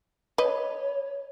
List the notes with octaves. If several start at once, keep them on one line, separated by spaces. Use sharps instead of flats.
B4 C#5 D#5